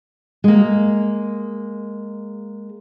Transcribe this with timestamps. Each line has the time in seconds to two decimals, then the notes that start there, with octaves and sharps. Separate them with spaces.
0.44 G#3 A#3